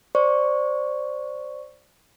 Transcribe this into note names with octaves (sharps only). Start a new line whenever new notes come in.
C5 D5 C#6